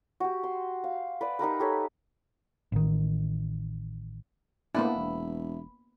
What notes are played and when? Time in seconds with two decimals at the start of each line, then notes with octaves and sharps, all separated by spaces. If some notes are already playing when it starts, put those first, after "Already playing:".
0.20 F#4 G4
0.43 C6
0.84 F5
1.21 B4 D5 D#5
1.39 D#4 G4 A#4 B4
1.60 G4 A4 C#5
2.72 A1 D#3
4.75 A2 A#3 B3 D4 E4
4.96 E1